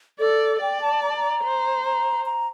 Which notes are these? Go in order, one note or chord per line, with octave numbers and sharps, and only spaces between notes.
A4 D5
D5 G5
A5
A#5
A5
A#5
C5
A#5
A#5